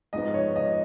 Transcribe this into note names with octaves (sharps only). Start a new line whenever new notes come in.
G#2 F3 B3 D#5
C#5
D#5